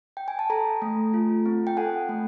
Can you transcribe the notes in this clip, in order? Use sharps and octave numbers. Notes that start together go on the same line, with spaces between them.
G5
G#5
A5
A4 G#5 A#5
A3
F4
C4
G5
A4 F#5 G#5
A3